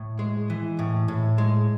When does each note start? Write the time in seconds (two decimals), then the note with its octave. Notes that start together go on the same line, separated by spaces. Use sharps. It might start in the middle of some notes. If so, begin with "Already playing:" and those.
Already playing: A2
0.19 G#3
0.50 E3
0.79 A2
1.08 A2
1.38 G#3